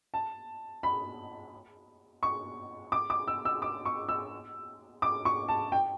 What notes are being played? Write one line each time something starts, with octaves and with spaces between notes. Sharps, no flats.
A5
B5
C#6
D6
D6
E6
E6
D6
C#6
E6
D6
C#6
A5
G5